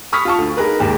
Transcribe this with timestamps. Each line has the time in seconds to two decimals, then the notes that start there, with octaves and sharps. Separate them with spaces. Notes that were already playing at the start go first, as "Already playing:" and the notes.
0.12 B5 C#6 D#6 F6 B6
0.25 F4 F5 A5 C#6
0.38 D2
0.57 D#4 G#4 A#4 B4
0.80 D#2 G#2